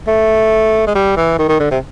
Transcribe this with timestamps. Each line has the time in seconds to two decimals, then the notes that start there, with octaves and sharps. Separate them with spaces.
0.07 A3
0.87 G#3
0.95 G3
1.17 E3
1.39 D#3
1.49 D#3
1.60 D3
1.71 C3